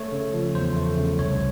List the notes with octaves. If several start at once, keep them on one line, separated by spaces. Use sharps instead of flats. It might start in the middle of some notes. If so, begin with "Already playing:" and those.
Already playing: A3 C#5
C#3
F3
E2 C5
A3
C#3
C2 C#5